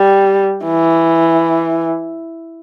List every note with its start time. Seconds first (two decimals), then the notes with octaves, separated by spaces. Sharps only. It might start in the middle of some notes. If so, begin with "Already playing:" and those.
Already playing: G3
0.65 E3